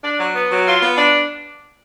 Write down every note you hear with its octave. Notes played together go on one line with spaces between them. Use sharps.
D4
F#3
B3
F#3
F4
B3
D4